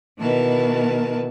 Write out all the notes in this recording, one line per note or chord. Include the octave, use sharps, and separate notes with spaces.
B2 D#3 E3 A#4 B4 A5